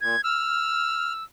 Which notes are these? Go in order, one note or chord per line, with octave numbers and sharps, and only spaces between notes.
A#2 G#6
E6 F6